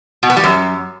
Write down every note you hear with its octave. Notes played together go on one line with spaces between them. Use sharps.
B2
B3
G3
F#2